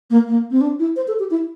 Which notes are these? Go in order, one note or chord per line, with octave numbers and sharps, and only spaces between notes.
A#3
A#3
C4
D4
E4
C5
A4
G4
E4